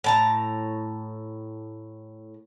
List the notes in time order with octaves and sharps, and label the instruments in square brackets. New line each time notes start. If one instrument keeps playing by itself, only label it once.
[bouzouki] A2 A5 A#5